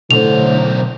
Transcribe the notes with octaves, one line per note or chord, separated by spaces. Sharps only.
B1 A2 D3 C5 F7